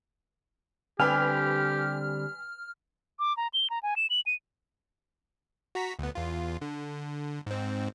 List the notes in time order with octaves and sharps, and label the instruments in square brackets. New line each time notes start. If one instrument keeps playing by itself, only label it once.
[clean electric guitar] D3 G3 C4 [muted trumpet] G4 [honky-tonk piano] B4 G5 G#5 [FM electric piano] F6
[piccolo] D6
A#5
G7
A#5
G#5
E7
F#7
D#7
[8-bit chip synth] F#4 A#5 B6
D2 B3
E2 F4
D3
G#2 C4